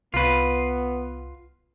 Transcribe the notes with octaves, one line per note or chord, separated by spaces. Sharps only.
C2 B3 F4 B4